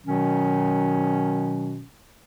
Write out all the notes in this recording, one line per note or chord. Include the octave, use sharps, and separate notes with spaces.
B2 D#3 F#3 C#4